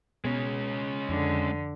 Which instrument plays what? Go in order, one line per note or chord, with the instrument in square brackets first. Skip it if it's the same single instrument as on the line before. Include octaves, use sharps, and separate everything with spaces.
[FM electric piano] B2 [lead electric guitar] G#3 C#4
[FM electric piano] F2 [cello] D3